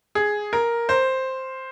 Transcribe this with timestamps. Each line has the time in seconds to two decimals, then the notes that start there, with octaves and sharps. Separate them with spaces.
0.15 G#4
0.53 A#4
0.89 C5